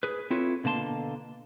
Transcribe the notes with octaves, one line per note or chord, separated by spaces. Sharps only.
G#4 B4
C4 E4 F4 A4 B4 C#5
B2 D3 A#3 A5 C6